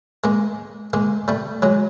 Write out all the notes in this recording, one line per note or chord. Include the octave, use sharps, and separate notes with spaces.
G#3 A#3
G#3 A#3
G3 A3
F#3 G#3